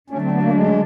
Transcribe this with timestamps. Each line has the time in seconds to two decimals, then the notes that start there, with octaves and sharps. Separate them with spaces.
0.10 D3 F#3 A3 C#4 D4
0.21 C4
0.32 B3
0.43 A#3
0.52 G#3